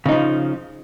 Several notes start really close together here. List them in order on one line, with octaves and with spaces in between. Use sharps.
C#3 D#4 F3